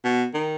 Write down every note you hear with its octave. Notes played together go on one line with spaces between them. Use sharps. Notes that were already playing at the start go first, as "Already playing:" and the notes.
B2
D#3